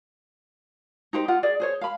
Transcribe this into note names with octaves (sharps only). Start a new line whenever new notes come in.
D#4 G4 C5
F4 F#5
G#4 D5
G#4 C5 C#5
F5 B5